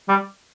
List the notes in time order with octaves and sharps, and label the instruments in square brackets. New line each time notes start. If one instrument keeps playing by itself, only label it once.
[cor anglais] G3